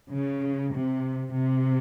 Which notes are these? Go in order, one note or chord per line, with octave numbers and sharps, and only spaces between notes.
C#3
C3
C3